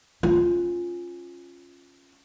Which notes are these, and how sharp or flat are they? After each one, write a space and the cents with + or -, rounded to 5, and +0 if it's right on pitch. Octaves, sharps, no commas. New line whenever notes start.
C#4 -10 F4 +0